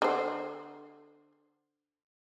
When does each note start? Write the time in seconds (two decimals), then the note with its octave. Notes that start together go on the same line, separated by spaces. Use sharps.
0.02 D3 C5